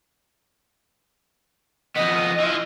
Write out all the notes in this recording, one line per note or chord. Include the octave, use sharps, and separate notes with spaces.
F2 B3 D#5
E3 F4